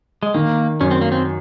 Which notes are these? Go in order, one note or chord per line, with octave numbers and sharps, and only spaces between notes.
G#3
D#3 A#3
F#2 C#4
C4
A#3
C4